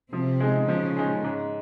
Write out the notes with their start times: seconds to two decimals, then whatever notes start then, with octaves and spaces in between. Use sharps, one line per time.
0.12 C3 F3 C4
0.40 G#3 D#4 G#4
0.68 C#3 F3 C#4
0.96 G#3 D#4 G#4
1.24 G#2